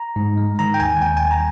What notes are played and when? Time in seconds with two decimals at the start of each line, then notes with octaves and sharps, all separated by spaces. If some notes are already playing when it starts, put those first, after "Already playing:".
Already playing: A#5
0.16 G#2
0.38 G#3
0.59 D#3 A#5
0.74 G5
0.80 D#2 G#5
1.01 D#2 G5
1.17 G#5
1.23 G3
1.31 A#5